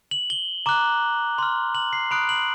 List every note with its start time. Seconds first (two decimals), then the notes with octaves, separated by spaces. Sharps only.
0.11 F#7
0.30 G7
0.66 A#5 D6 F#6
1.38 C6 F6
1.75 F#7
1.93 C7
2.11 B5 D#6 F#6 D7
2.29 F#7